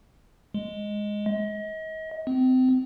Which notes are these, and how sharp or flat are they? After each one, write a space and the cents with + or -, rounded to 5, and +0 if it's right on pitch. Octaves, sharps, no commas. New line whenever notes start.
G#3 +0
D#5 +35
C4 -30